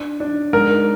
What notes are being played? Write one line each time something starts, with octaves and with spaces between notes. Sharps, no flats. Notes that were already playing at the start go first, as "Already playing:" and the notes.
Already playing: D4
D4
G#2 A#4